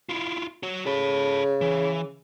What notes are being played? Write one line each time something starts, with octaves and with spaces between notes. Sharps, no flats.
E4 F4
F#4 C#5
C#3 A4 B5
E3